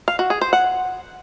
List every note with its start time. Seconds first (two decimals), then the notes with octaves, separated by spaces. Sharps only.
0.08 F5
0.19 F#4
0.30 G#4
0.41 C5
0.53 F#5